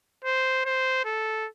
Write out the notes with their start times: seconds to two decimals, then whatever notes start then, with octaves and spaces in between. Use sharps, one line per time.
0.25 C5
0.65 C5
1.05 A4